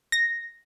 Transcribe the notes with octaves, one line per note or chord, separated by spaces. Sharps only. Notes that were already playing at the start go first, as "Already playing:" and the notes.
A#6